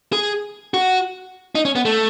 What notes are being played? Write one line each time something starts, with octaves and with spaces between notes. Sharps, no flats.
G#4
F#4
D#4
C#4
B3
A3